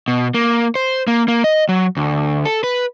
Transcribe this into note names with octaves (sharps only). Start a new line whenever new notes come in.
B2
A#3
C5
A#3
A#3
D#5
F#3
D2
A4
B4